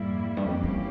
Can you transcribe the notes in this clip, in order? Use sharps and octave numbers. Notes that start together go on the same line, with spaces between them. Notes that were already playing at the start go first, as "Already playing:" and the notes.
Already playing: F2 G#2 G3 A#3 E4
G2
F2 E3 A#3 C#4 G4
G2